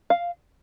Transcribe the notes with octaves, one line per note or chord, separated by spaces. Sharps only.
F5